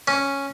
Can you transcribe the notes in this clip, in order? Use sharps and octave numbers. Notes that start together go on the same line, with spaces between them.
C#4